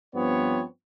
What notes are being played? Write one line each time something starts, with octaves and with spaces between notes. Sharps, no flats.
G2 F3 B3 C4 C#5